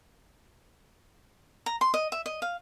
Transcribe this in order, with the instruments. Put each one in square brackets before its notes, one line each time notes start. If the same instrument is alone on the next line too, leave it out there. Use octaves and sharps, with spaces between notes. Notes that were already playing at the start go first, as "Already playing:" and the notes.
[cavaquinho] A#5
C6
D#5
E5
D#5
F5